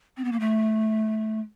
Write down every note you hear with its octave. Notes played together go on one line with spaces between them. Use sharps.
C4
B3
A#3
A3